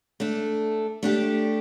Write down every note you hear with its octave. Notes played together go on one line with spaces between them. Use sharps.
A3 D4 A4
A3 D4 G4